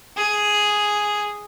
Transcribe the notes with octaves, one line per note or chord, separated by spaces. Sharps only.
G#4